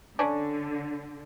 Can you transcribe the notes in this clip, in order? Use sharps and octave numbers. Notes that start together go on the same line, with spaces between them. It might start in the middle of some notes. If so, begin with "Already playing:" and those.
D3 C#4 D4